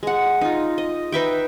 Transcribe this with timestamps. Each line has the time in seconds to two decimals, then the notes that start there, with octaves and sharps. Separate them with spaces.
0.03 G#3 F#5
0.41 D#4 F4
0.78 D#5
1.12 D#4 B4 E5 G5